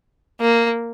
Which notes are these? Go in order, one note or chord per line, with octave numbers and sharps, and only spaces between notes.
A#3